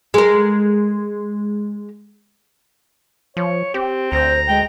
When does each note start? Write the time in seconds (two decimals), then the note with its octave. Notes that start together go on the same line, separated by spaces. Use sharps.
0.14 G#3 A#4
3.37 F3 C#5
3.74 C4 G4
4.12 D2 C5 A#5
4.48 G#3 G5